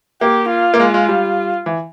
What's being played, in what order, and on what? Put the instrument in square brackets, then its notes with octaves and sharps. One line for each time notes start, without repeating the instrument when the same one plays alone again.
[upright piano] A#3 [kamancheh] G4
[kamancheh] F4
[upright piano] A#3
G#3
G#3
G3
E3